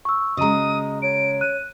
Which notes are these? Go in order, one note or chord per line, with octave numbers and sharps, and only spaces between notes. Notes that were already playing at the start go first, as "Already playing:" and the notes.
C#6 E6
C#3 G#3 F#4 D#5 A#5 D#6
C#5 D7
F#6 D#7